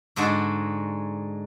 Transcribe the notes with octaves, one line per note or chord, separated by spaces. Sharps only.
G#2 D3 G#3 D4 F#4 A5